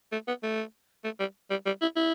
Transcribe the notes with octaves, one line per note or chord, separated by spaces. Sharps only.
A3
B3
A3
A3
G3
G3
G3
E4
E4